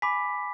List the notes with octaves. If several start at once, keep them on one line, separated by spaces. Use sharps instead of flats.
G#5 B5 D6 B6